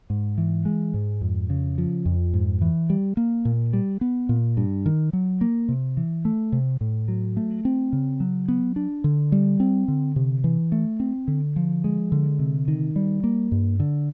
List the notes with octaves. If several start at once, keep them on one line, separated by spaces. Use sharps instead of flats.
G#2
E3
G#3
G#2
F2
C#3
F3
F2
G#2
E3
G3
A#3
A#2
G3
B3
A#2
G2
D#3
F#3
A#3
C3
E3
A3
C3
A2
F#3
A3
C4
C#3
F#3
B3
D4
D3
G3
C4
D3
C3
E3
A3
C4
D3
F3
G#3
D3
C3
D#3
G3
A#3
G2
D3